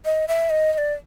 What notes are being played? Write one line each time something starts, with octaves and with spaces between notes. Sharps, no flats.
D#5
E5
D#5
D#5
D5